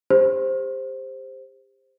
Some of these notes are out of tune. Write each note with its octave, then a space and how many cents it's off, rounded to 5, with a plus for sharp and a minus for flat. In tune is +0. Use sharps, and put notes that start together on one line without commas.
G4 +35 C5 +0